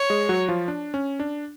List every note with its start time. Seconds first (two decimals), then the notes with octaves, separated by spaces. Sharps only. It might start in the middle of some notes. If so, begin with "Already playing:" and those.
Already playing: C#5
0.10 G#3 G#4
0.29 F#3 F#4
0.48 F3 F4
0.68 D4
0.94 C#4
1.20 D4